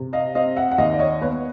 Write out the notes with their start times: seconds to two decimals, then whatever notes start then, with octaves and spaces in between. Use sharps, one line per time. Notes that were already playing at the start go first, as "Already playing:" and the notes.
Already playing: C3
0.13 D#5 F5
0.35 C4 D#5 F5
0.56 E5 F#5
0.71 F#5
0.78 D#2 D#5 F5
0.94 D5
0.99 C#5 D#5
1.21 B3 B4 C#5